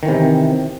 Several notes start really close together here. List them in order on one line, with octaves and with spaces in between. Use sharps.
D#3 E3 C3